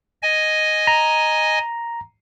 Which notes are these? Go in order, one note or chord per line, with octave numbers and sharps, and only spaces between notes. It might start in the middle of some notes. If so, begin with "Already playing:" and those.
D#5 G#5
A#5